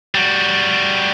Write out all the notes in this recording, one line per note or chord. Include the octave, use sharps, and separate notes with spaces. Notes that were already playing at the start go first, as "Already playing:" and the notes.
G3 F#4